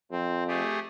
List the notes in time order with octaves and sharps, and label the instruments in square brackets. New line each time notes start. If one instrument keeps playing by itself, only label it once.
[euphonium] F2 [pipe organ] C4
[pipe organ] A3 G4 G#4